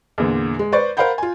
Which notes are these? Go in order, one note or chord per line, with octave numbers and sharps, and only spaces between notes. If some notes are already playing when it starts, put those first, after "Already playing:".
E2 A#2 D3
G#3
B4 C5 D5 C#6 A6
A#4 C5 F5 F#5 B5 G6
F4 G#5